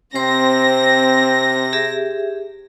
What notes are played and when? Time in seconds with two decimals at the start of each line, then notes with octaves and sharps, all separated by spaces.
0.15 C3 C4 C5 C6 A#6
1.73 G4 G#4 E5